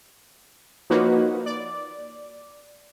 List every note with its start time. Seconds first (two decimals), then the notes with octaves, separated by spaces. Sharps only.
0.90 F3 A#3 D#4 F#4 B4 C#5
1.46 D5